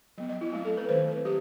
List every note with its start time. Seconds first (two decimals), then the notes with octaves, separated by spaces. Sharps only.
0.18 F#3 B3 D#5
0.29 D#5
0.41 E4
0.53 F#3 A3 C4 E4
0.65 A4
0.77 B4
0.89 D#3 A3 C4 C5
1.08 B4
1.25 F#3 G4